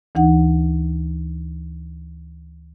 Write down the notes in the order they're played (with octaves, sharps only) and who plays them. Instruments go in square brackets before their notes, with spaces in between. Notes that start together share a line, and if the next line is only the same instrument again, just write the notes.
[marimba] D2 E3 D#4 F#5